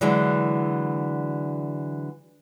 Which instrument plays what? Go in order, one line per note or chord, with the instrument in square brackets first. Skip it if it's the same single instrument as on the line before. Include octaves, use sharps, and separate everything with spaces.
[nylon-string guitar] D3 E3 F#3 G#3